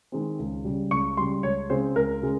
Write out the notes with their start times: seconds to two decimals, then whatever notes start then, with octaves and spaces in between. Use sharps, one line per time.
0.12 D#3 G#3 C4
0.39 C#2
0.64 C#3 G3
0.91 C#2 C#6
1.17 C#3 G3 C6
1.43 C#2 C#5
1.70 C#3 G#3 C4 C5
1.95 C#2 A#4
2.22 C#3 G#3